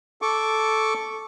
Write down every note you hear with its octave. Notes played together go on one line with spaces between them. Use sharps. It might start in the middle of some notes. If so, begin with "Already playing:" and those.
A4 C#6 D6